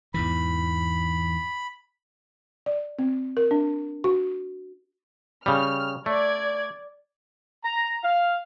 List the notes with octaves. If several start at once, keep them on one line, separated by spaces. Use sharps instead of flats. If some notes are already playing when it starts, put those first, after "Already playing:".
E2 G#2 E3 B5
D5
C4
A#4
D4
F#4
C#3 G3 F6
A3 D5 G#6
A#5
F5